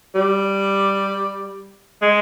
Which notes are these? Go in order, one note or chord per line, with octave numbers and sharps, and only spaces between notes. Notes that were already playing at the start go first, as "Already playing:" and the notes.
G3
G#3